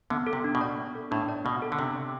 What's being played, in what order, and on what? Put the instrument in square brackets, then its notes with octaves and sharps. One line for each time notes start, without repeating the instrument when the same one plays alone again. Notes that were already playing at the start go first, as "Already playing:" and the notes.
[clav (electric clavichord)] D3 [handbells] B3
[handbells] A4
[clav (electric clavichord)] C3
[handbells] D4
[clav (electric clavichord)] B2
[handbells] D5
B3
A4
[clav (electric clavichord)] A2 [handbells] D4
[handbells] D5
[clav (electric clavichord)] B2 [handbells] B3
[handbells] A4
[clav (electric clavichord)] D3
[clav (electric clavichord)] C3 [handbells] D4
[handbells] D5